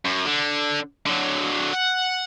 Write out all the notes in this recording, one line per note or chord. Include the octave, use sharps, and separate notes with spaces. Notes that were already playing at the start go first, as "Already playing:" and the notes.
F#2
D3
D3 F#3
F#5